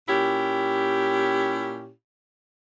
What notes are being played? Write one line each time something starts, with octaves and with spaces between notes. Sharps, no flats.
A#2 C#4 E4 G4